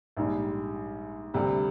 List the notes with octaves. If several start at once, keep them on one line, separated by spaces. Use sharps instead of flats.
A#1 G#2 D#3 G3
D2 C3 G3